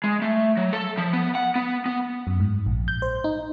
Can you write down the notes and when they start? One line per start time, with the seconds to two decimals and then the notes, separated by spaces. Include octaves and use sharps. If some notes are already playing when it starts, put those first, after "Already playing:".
0.04 G#3
0.22 A3
0.57 F#3
0.73 A4
0.98 F3
1.13 B3
1.35 F#5
1.55 B3
1.86 B3
2.27 F#2
2.40 G#2
2.66 A#1
2.88 G6
3.02 C5
3.24 D#4